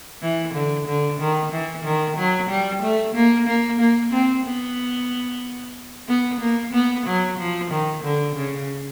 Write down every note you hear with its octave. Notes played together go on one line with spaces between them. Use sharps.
E3
D3
D3
D#3
E3
D#3
F#3
G3
A3
A#3
A#3
A#3
C4
B3
B3
A#3
B3
F#3
F3
D#3
D3
C#3